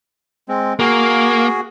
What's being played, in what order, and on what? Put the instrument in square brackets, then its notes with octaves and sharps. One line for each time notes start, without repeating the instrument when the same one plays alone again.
[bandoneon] G#3 C4
[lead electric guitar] A#3 [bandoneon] F#4 G#4